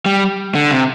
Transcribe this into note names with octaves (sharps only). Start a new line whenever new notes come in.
G3
D3
C3